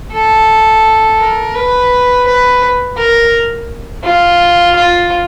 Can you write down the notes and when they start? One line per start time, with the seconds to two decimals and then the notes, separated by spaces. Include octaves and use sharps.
0.12 A4
1.19 A#4
1.55 B4
2.27 B4
2.97 A#4
4.04 F4
4.75 F4